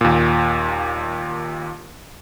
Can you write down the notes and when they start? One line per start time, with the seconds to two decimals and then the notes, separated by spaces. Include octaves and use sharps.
0.01 D#2 A#2